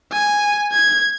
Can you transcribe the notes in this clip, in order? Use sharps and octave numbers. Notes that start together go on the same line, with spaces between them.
G#5
G#6